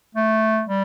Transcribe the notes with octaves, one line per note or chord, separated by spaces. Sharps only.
A3
G3